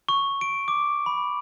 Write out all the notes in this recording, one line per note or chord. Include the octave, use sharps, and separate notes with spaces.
C#6
D7
D6
B5